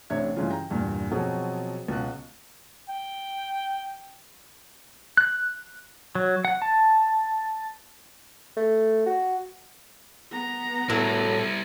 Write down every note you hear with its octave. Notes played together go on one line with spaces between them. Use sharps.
A1 C3 D4 C#5 E5 G#6
G2 C#3 E3 G#3 F4
G5 A#5
E2 G2 A#2
B2 F3 F#3 C4 G#4
C#2 B2 F#6
G5
F#6
F#3
F#5
A5
A3
F#4
B3 A#5
A2 F#3 G3 E4